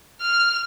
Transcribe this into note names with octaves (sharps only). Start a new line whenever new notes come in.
F6